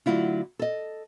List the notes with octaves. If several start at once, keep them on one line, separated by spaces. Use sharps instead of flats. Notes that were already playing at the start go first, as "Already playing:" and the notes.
D3 F#3 A3 E4 F4
A4 D#5